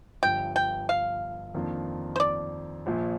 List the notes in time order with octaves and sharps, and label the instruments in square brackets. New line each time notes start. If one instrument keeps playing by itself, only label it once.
[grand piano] G1 G2 F3 [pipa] G5
[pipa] G5
F5
[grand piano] F2 D#3 A#3 D4 F4
[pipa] C5
D5
[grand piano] A#1 A#2 F3